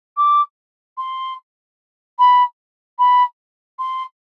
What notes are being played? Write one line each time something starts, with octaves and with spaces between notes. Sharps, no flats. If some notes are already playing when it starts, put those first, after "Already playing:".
D6
C6
B5
B5
C6